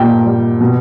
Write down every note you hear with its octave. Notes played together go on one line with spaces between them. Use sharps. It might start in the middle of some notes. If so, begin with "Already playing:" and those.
Already playing: A#2 G3 G5
G3
B2